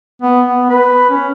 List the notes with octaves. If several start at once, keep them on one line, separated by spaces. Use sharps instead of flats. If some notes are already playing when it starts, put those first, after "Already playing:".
B3
B3
B4
C#4